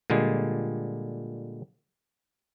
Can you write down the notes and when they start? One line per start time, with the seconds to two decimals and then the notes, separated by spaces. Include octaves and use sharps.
0.10 A#2 D3 G3 G#3